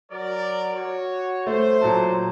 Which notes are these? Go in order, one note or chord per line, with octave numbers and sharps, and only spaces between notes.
F#3 A#4 D5
F#4 C#5
A3 C5
A#2 F#3 A5